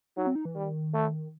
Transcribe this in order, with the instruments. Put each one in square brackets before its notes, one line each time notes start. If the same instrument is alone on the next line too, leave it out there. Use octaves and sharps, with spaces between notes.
[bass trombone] F#3 [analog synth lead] D#4
[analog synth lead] C4
D#4
E3
[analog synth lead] D#3 [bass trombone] G3
[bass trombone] A3